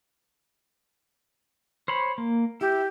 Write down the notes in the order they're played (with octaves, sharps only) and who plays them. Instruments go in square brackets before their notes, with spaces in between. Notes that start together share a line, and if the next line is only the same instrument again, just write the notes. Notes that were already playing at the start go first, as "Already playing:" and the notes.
[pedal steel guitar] C5 C#5 B5
A#3
[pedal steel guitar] E4 [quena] G4